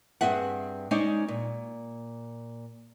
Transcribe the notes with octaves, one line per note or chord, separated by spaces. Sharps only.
G2 C4 G#4 E5 F#5
G#3 C#4 D#4 C5 D5
A#2